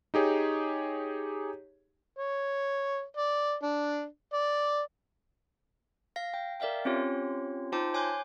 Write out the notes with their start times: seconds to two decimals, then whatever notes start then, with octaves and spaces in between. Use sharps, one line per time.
0.14 D#4 G4 G#4 C#5
2.16 C#5
3.17 D5
3.63 D4
4.33 D5
6.16 F5 A#6
6.34 G5
6.60 A#4 D5 E5 F5 G5
6.85 C4 C#4 F4 G4 C#5
7.72 D#4 F4 C5 G5 A5 D6
7.94 C#5 G#5 C6 D6 F#6 G6